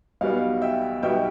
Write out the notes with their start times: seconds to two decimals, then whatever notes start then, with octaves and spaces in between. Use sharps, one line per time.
0.21 B1 B2 G3 B3 F5
0.62 E5 G5
1.03 B1 B2 G3 B3 E5 G5